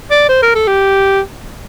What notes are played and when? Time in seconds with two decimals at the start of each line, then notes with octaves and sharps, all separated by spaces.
0.11 D5
0.29 C5
0.42 A#4
0.55 A4
0.67 G4